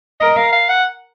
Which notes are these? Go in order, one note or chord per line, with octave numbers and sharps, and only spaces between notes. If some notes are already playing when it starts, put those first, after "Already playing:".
A#4 D#5
F5
F5
F#5